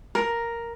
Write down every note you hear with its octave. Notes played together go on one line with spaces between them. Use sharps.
A#4